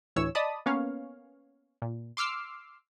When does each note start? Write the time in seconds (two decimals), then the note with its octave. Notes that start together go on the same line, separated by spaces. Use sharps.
0.16 D2 A2 E3 C#5 E6
0.35 D5 D#5 A5 B5 D#6
0.66 A#3 B3 C#4 C#5 F5
1.82 A#2
2.17 C6 D6 E6 F6 C7